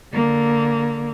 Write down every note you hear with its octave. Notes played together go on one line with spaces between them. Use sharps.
D3 A#3